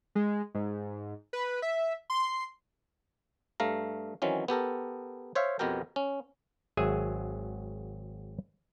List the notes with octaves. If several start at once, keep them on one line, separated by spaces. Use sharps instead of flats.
G#3
G#2
B4
E5
C6
G2 A3 F5 A#5
D#3 E3 F#3 C4 C#4
B3 G4 A4 A#4
C5 C#5 E5 F5
F2 B2 B3 G4 A#4 G5
C#4
G#1 F#3 G#4 E5 G#5